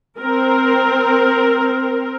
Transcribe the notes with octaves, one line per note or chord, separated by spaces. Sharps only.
C4 A#4